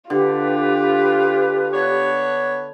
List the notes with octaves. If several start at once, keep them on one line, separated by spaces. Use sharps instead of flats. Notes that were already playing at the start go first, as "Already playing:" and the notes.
D3 F4 G4 B4
B3 D4 C#5